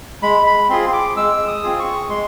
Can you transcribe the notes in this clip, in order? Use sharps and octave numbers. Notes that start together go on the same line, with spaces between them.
G#3 B5
B5
C4 F4 G#4 C6
D6
G#3 E6
D#6
C4 F4 G#4
C#6
G#3 C6